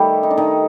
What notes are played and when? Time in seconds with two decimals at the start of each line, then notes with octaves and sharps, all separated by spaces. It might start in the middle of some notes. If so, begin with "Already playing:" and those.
Already playing: D#3 G3 A3 G4 A4
0.23 D#4
0.30 D4
0.38 D#3 D#4